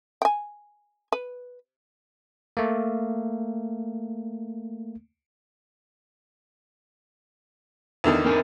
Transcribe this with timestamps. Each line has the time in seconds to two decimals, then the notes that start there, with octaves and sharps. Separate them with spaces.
0.22 G5 G#5
1.12 B4
2.57 A3 A#3
8.04 E2 D3 D#3
8.25 C4 A#4 G#5